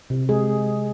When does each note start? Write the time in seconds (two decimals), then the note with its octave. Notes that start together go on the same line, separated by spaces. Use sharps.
0.10 C3
0.29 G#3 G#4